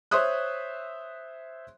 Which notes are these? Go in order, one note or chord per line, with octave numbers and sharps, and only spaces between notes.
C5 C#5 E5 D#6 F#6